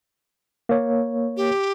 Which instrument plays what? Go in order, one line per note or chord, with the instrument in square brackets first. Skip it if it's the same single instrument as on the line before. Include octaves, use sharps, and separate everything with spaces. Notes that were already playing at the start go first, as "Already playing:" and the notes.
[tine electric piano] A#3 C#5
[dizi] G4